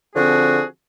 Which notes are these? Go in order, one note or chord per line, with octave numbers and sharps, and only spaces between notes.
D3 F3 C4 F#4 G#4